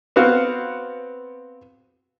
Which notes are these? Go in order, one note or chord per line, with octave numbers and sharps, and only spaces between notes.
B3 C4 F#4 F5